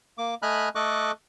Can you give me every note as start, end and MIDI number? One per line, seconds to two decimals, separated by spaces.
0.18 0.34 58
0.18 0.34 86
0.42 0.69 57
0.42 0.69 75
0.42 0.69 80
0.42 0.69 83
0.42 0.69 89
0.42 0.69 90
0.75 1.11 57
0.75 1.11 69
0.75 1.11 75
0.75 1.11 85
0.75 1.11 86
0.75 1.11 90